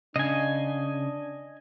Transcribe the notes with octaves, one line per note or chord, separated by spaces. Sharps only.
C#3 D4 D#5 G#5